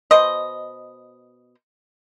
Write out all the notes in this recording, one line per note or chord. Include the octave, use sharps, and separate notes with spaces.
B2 C5 D#5